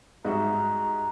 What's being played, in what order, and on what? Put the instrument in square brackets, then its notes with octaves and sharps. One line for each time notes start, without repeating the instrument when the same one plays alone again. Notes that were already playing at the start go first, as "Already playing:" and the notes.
[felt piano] G#2 D#5 [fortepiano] G3 F#4 E5 [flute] A#5